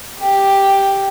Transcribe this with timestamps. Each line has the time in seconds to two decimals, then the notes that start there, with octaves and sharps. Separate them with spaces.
0.20 G4